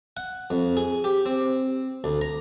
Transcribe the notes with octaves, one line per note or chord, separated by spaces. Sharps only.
F#5
F2
G#4
G4
C4
D2
A#5